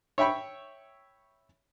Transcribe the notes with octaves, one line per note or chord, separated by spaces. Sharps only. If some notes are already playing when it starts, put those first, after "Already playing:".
C#5 E5 G5 B5 C#6